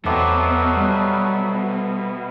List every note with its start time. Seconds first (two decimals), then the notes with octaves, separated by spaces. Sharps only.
0.05 E2 B2 F#3 A3 B3 C4 D6
0.77 G3